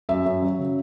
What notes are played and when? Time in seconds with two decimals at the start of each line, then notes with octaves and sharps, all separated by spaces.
0.09 F#2 E5
0.26 F#2
0.42 F#3
0.59 C#3